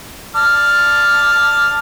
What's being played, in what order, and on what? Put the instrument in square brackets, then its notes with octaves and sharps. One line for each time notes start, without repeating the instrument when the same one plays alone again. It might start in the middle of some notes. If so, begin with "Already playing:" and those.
[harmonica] D5 A5 F6